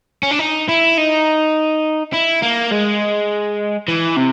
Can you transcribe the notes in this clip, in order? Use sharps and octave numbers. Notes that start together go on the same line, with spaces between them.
C#4
D4
D#4
E4
D#4
E4
A#3
G#3
E3
C3